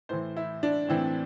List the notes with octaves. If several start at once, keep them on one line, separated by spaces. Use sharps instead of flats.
A2 E3 C5
E4
D4
A2 E3 C4